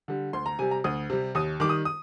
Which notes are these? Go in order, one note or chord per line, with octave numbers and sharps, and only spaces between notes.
D3 G3
D2 C6
A#5
C3 G3 G#5
A#5
D2 D#6
C3 G3
D#2 D#6
D#3 G3 D6
D#6
D#6